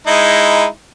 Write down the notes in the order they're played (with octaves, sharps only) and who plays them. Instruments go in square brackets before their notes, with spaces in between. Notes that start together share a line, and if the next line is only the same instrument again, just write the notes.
[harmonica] G#3 D#4 E4